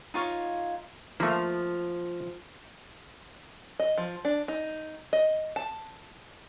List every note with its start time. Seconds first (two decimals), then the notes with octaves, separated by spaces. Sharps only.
0.14 D#4 F4 C#5 F5
1.20 F3 A3 A#3
3.79 D#5
3.98 F3
4.25 D4
4.48 D#4
5.13 D#5
5.56 A5